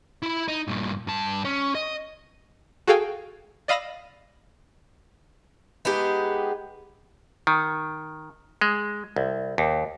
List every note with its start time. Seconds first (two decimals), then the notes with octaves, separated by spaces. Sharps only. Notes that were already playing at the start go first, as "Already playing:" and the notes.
0.22 E4 B5
0.48 D#4
0.68 G2 A#2
1.07 G2 A5
1.45 C#4
1.75 D#5
2.87 F#4 G#4 A4 F5 G5 G#5
3.68 D5 D#5 F5 B5 E6 A#6
5.85 G#3 B3 D#4 G4
7.47 D#3
8.62 G#3
9.16 C2
9.58 D#2